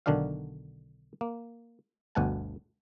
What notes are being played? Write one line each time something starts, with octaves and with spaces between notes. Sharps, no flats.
B1 D3 D#3 D4 F#4 F5
A#3
G1 D2 B2 F#5 G#5 A5